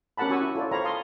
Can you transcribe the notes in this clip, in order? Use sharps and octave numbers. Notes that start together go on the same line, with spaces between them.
C#4 G4 A#4 F#5 A5 B5
C#4 F#4 G#5 C#6 E6
E4
F4 A4 C#5 D5
C5 C#5 F5 G5 A#5 B5
F5 A5 C6 D#6